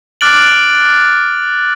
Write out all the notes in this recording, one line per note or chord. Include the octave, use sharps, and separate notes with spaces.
D6 F6 F#6 A6 D7 F#7